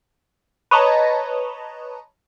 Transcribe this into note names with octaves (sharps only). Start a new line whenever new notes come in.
B4 C#5 D#5 A5 A#5